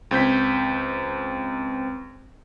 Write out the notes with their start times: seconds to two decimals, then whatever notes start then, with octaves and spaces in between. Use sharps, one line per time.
0.11 C#2 C4 G6 B6